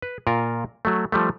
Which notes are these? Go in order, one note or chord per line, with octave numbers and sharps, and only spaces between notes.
B4
A#2 F4 A#4
F#3 A3
F3 G3 A3